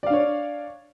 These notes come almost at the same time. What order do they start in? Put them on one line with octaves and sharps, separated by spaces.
D5 F5 D4 C#5